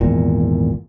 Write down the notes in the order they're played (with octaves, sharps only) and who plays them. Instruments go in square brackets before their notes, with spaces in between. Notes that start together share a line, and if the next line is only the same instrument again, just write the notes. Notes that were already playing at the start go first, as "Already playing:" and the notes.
[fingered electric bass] G#1 E2 A#2